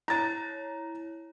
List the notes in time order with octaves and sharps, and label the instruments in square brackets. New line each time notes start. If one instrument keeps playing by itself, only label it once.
[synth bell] E4 C#5 [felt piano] A#5 A6